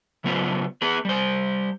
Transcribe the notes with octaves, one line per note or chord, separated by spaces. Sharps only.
C#3 F#3 B3 F4 B4 C5
B3 G#4 B4
G3 C5